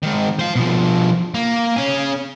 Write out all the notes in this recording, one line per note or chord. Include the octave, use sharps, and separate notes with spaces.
G#2 D#3
C5 F5
B2 F3
A#3
C#4 G#4